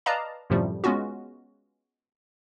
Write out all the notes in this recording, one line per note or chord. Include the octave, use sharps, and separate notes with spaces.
B4 D5 D#5 F5 A5 A#5
F#2 A2 C3 F3 G3 A3
G#3 B3 C#4 F4 F#4